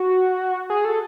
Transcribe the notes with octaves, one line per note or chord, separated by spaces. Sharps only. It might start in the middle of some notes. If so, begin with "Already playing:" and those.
Already playing: F#4
G#4
A4